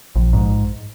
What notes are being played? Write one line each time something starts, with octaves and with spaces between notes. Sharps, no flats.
A#1
G#2